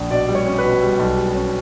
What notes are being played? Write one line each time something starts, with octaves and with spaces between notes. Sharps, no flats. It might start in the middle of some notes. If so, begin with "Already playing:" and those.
Already playing: A#1
B2 D5
G3
C#5
C#4
B4
B2
G3
B1
G3
C#4